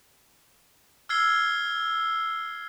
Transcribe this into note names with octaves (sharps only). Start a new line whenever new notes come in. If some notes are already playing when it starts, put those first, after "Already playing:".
E6 F6 G#6 C7 G7